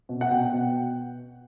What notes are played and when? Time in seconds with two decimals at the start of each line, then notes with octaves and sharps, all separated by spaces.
0.09 B2
0.21 F#5
0.31 B2 G5
0.53 B2